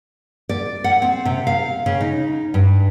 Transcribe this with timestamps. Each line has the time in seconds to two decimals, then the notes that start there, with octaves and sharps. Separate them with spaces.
0.49 D5
0.84 F#5
1.02 C4
1.25 C3
1.47 F5
1.86 C#3
2.01 D#4
2.54 G2